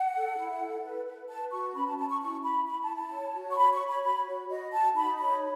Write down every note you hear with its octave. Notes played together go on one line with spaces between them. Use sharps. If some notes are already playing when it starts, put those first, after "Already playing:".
Already playing: F#5
A4
E4
A4
B4
B4
B4 A5
F#4 C#6
C#4 B5
A5
C#4 A5
C#6
E4 C#6
E4 B5
E4 B5
A5
E4
A5
C#5
F#4
C#6
C#5 B5
C#6
C#5
B5
F#4 B5
F#4
F#4 D#5
F#4 A5
D#4 B5
C#5 B5